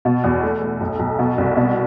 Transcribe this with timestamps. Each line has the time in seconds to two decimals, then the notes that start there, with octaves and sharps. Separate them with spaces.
0.05 B2
0.24 E2
0.43 A3
0.61 A3
0.80 B1
0.99 B1
1.19 B2
1.38 C2
1.57 B2